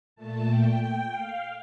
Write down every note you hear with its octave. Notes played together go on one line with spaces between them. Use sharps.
A#2 A3 A5
G5
F5